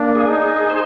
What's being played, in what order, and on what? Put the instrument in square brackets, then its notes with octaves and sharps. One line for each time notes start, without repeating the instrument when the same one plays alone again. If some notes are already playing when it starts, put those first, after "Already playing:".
Already playing: [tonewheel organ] A#3 [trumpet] D4
[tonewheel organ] G#4
[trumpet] D#4
[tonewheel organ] G#4
C5